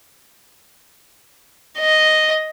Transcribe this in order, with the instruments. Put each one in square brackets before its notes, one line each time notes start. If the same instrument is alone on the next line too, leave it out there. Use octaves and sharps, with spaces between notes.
[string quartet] D#5